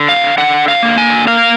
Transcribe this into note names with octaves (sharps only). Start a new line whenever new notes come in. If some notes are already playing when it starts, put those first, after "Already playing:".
Already playing: D3
F5
D3 F#5
F5
A#3
G#5
A#3 F5